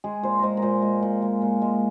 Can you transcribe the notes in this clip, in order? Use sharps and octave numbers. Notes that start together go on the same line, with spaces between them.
G#3 G#4
A#2 C5
G#3 A#4 C5
A#4
A#2 C5
G#3
A#2
G#3
A#2
G#3